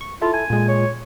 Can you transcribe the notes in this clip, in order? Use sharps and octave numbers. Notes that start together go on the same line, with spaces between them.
C#6
E4 F4 A4
G#5
A#2 G#3
C#5